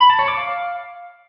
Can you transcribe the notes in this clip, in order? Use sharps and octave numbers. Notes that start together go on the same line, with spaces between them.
B5
A5
C#5
D6
F5